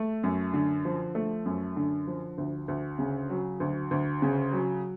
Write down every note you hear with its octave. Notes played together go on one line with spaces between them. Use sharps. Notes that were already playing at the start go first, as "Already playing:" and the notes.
Already playing: A3
F#2
D3
F3
A3
F#2
D3
F3
D2
D2
C#3
F#3
D2
D2
C#3
F#3